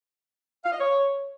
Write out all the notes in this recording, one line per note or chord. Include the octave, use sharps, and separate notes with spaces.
F5
D#5
C#5